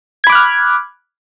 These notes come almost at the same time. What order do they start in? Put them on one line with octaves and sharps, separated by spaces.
G#6 B5 D6 F#6 F6